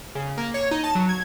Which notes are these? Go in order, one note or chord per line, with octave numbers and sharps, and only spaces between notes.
C#3
A#3
C#5
D#4
A5
F#3
G#6